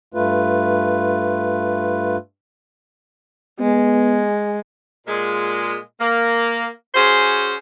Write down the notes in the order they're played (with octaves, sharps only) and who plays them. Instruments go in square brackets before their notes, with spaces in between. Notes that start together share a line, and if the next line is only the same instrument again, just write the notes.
[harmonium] G2 A3 F4 B4
[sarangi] G#3 [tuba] B3
[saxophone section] A#2 G#3
A#3
C#4 F#4 G#4 C5